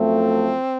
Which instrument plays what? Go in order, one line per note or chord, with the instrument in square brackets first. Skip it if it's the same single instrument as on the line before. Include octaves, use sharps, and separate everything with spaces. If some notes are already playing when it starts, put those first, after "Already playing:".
Already playing: [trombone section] F#2 F3 A3 [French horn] C4